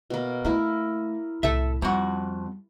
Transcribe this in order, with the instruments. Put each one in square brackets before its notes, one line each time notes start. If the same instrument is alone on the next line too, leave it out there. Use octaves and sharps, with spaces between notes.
[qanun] B2 A#3
[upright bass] A3 [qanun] A#3 E4 A#4
[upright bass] C2 A2 [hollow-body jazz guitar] A4 E5
[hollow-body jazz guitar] F2 F#4 [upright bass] G3